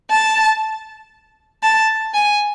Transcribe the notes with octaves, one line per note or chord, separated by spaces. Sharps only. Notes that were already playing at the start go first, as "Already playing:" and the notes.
A5
A5
G#5